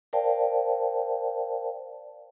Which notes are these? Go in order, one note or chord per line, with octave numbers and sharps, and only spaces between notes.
A#4 C5 D5 F5 G5 A5